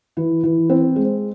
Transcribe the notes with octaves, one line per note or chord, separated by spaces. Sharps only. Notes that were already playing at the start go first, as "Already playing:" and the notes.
E3
E3
C4
G#3